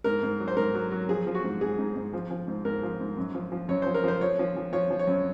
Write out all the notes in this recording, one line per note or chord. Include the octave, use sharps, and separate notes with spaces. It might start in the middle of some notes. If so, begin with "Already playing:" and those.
G#2 A#4
G#2
F#3
C5
G#2 A#4
F#3
F#3
F3 G#4
F3
F#4
G#2
G#2 G#4
G#2
G#2
F3
F3
G#2
G#2 A#4
F3
G#2
F#2
F3
F3
F#2 C#5
F3 C5
A#4
F3 C5
F3 C#5
F3
F3
F3 C#5
F3
C#5
F#2